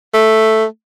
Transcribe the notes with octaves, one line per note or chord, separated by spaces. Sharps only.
A3